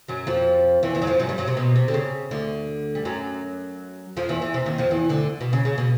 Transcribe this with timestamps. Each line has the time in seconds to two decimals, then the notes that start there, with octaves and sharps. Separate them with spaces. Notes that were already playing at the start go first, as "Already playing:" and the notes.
0.08 F#2 F#3
0.27 F2 F3
0.83 E2 E3
0.95 E2 E3
1.02 F#3
1.07 F2 F3
1.20 F#2 F#3
1.29 G2 G3
1.38 F#2 F#3
1.48 C3
1.57 B2
1.76 C3
1.88 D3
1.94 C#3
2.31 D2 D3
2.95 G3
3.05 F#2 F#3
4.17 F2 F3
4.29 E2 E3
4.42 E2 E3
4.54 C3
4.66 D#2 D#3
4.78 F2 F3
4.91 E2 E3
5.09 D2 D3
5.41 B2
5.53 C#3
5.65 C#3
5.78 B2